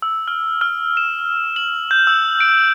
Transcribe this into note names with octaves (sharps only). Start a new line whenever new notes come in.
E6
F6
F6
E7
F#7
G6
E6
D7